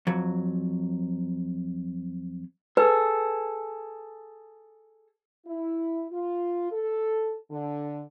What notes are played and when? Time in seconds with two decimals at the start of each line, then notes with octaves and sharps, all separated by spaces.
0.07 F2 F#3
2.77 G#4 A4 B4
5.46 E4
6.11 F4
6.72 A4
7.51 D3